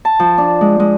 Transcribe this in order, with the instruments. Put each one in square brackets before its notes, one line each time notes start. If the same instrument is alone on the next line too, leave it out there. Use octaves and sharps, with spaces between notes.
[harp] A5
F3
D4
G#3
G#3